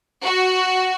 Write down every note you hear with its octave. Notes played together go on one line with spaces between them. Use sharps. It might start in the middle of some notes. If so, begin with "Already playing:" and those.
F#4